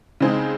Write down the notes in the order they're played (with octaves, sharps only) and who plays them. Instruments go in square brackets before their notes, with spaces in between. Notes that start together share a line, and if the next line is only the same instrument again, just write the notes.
[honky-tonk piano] C#3 G#3 C4 D#4 G#4